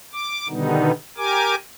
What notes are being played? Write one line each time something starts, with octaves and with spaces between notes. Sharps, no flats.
D6
B2 D3 D#3 G3 B3 D#4
G4 A#4 G#5 D6